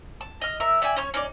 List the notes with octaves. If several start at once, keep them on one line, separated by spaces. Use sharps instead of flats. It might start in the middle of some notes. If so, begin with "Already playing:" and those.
A5
D#5 F6
A#4 E5
D5 E5 G5 G#5
C#4 C#5
C#4 D#4 D5